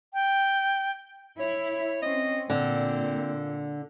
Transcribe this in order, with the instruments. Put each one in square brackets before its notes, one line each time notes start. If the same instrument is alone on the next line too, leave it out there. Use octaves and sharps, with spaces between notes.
[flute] G5
[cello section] E4 [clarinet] C#5
[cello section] C4 C#4 [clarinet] D#5
[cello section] A#2 [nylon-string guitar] D3 [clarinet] C4